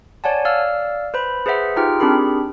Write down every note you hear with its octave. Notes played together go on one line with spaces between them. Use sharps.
C#5 D5 F#5 G#5 A5
D5 F5 E6 F6
B4 C5 B5
G#4 B4 C5 E5 F#5
D#4 F4 G4 G#4 G5 F6
C4 D4 G4 G#4 A#4 B5